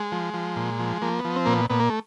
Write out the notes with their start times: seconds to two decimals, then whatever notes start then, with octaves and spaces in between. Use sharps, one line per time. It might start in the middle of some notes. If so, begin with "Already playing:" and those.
Already playing: G#3
0.12 F3
0.34 F3
0.56 A#2
0.80 F3
1.02 F3 A#3
1.19 B3
1.25 F3
1.36 C4
1.45 A#2 A#3
1.53 B3
1.70 A#2 B3
1.80 A#3
1.90 A3